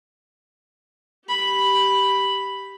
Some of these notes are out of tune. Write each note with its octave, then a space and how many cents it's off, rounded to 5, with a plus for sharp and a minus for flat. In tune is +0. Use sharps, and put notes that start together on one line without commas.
G4 -5 B5 +0